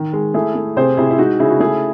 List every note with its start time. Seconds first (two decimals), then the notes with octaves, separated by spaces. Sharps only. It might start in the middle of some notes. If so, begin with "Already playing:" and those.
Already playing: D#3
0.13 G#3
0.34 A3 E4 G#4
0.55 A3
0.76 C3 G#4 C5
0.97 C3 E4 G#4
1.11 E4
1.18 G#3 D#4 F#4
1.39 C#3 E4 G#4
1.50 F#4
1.60 A3 E4 G#4